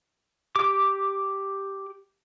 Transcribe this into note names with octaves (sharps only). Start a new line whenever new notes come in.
G4 D6